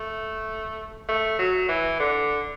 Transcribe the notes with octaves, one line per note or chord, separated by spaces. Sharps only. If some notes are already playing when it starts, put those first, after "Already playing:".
Already playing: A3
A3
F#3
E3
D3